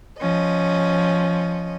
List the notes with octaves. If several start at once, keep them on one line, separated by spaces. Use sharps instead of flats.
F3 C#4 D#5